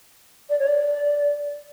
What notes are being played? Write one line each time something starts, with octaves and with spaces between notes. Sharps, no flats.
D5
C#5
D5